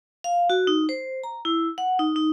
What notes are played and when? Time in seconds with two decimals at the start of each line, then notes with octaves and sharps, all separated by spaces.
0.24 F5
0.50 F#4
0.67 D#4
0.89 C5
1.24 A#5
1.45 E4
1.78 F#5
1.99 D#4
2.16 D#4